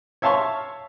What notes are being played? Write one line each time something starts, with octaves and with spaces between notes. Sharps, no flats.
C#5 E5 F5 A5 C6 C#6